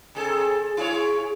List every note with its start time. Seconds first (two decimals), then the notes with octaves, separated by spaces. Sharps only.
0.15 C3 G#4 A4
0.77 E4 G#4 C#5